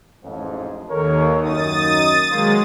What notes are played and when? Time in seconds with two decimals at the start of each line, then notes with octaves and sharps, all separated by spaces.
0.24 A1 F2 G#2
0.89 D#2 A4 A#4 C#5
1.42 F#2 D#4 D#6 A6
2.30 D#3 F#3 G#3 A#3 C5